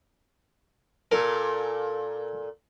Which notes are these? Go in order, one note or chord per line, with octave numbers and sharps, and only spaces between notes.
A#2 A4 A#4